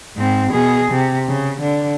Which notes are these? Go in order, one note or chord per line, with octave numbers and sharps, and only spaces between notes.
G#2 C4
B2 G#4
C3
C#3
D3